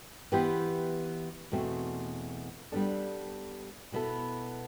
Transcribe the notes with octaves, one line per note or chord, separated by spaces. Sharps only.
E3 B3 E4 G4 C5
E2 B2 A3 C4
G3 B3 D4 A4 D5
B2 B3 E4 A4